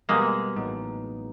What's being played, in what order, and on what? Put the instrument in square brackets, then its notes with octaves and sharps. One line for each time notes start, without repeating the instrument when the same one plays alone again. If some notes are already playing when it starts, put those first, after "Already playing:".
[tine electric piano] B2 G3 B3 [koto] G#3 A#3
[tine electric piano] A1 A2 F#3 B3 D#4